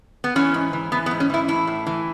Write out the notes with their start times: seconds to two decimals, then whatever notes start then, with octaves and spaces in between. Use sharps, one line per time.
0.24 B3
0.36 E3 C#4
0.54 G#2
0.73 E3
0.92 E3 B3
1.06 B3
1.11 G#2
1.20 C#4
1.30 E3 E4
1.48 A2 E4
1.67 A2
1.87 E3